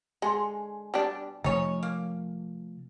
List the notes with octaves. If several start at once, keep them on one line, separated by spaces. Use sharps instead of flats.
D3 G#3 G#5 C6
B2 G3 D4
C3 F3 A3 C#4 D#4 C#5
A#3